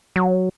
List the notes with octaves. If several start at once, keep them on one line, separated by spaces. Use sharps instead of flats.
F#3